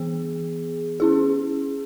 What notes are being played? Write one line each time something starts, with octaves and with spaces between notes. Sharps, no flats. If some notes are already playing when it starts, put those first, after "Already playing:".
Already playing: E3 B3 G#4
C#4 E4 G#4